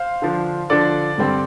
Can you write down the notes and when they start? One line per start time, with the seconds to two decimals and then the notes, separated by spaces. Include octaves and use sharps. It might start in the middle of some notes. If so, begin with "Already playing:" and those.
Already playing: C5 F5
0.22 D3 F3 D4
0.70 D3 F3 D4 A4 D5
1.18 G2 D3 G3 C4